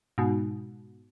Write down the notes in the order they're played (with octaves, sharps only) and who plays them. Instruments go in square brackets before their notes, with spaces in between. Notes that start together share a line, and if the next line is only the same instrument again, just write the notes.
[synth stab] G#2 B2